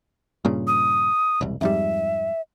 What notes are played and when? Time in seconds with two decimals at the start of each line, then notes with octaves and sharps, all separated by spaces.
0.45 G2 A#2 C#3
0.67 D#6
1.41 E1 C2
1.61 F2 G#2 G3 E5